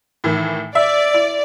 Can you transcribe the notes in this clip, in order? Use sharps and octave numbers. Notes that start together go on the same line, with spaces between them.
A2 D#3 E3
D5 E5
E4